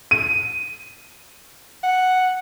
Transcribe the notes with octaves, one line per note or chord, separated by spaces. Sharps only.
D#7
F#5